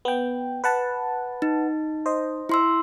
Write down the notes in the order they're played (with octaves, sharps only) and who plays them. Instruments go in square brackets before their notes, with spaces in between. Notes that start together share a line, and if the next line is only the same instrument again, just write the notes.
[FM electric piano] B3 G5
B4 F#5 A5
[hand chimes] D#4
[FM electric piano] C5 D#5
[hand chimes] E4 C6 E6